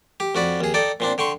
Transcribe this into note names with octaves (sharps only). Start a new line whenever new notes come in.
G4
F2 F#4 D5 B5
D#2 G#4
D#4 A4 D5 G5
A#2 C4 D4
D3 G5 C6 C#6